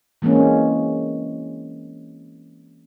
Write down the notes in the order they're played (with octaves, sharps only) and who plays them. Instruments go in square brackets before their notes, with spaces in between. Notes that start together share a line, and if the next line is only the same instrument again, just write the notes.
[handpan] E3 G#3 A#3 C4 C#4